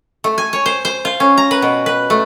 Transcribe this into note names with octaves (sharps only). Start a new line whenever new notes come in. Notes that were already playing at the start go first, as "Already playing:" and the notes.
A3
G#5
C#5
C5
C5
F4
C#4
A#5
B4
B2
B4
A3